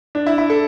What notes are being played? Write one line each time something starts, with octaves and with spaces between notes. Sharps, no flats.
D4
E4
E4
A4